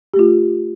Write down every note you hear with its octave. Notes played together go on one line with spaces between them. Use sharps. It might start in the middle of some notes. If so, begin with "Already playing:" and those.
A3 F4 G4